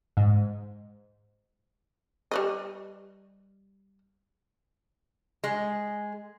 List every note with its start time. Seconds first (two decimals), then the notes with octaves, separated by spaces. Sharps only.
0.17 G#2
2.31 G3 B4 D#5
5.44 G#3